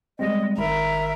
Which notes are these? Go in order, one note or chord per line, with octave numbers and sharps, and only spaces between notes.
G3 G#3 C4 D#5
G#1 D#3 A#4 E5 B5